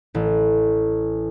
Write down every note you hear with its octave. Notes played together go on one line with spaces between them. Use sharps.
A1